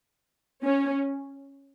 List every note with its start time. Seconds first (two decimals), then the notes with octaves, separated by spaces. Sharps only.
0.64 C#4